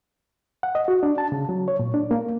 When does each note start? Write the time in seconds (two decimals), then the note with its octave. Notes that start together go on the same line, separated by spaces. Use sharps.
0.63 F#5
0.75 D#5
0.88 F#4
1.03 D4
1.18 A5
1.32 C#3
1.49 F#3
1.68 C#5
1.79 A#2
1.94 D4
2.11 A#3